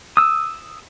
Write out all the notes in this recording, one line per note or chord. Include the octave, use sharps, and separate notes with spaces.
D#6 E6